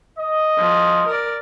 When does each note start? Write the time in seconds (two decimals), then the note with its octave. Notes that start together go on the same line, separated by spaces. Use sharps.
0.18 D#5
0.57 F3
1.07 A#4 D5